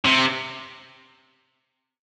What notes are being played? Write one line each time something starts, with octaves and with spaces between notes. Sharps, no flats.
C3